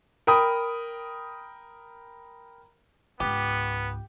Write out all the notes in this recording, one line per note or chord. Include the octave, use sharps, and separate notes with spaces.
A#4 G5 B5 D#6
C#2 G#2 B3 G4